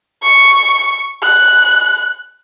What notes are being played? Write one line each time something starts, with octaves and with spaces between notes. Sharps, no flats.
C#6
F#6